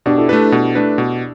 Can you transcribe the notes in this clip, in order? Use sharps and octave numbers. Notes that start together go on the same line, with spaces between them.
B2 D4 G4
E4 A4
A3 D4 E4 A4 B4
B2
A3 D4 B4
B2